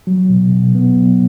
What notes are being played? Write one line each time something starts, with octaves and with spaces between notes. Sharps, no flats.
F#3
B2
B2
B3
F#3